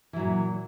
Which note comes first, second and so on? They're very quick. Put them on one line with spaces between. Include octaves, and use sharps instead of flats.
E3 F#3 A#2